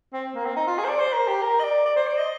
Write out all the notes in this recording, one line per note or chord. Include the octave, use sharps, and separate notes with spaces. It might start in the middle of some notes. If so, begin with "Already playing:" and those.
C4
A#3
C4
D#4
F4
G#4
C5
D5
C5
A#4
G4
A#4
D#5
D5
D5
C5
D5
D#5